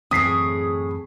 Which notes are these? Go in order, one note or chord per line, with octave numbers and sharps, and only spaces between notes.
F#2 A2 E3 C4 G#4 D#6 B6 C7